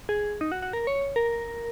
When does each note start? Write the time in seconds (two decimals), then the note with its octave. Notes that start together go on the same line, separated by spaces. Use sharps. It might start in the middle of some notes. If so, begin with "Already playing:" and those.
0.09 G#4
0.41 D#4
0.52 F#4
0.62 F#4
0.73 A#4
0.87 C#5
1.16 A#4